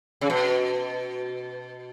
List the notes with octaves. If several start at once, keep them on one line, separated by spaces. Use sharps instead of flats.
C#3
B2